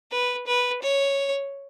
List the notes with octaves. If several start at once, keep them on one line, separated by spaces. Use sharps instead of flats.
B4
B4
C#5